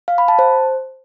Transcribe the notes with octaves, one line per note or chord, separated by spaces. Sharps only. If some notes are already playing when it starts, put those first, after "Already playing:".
F5
B5
A5
C5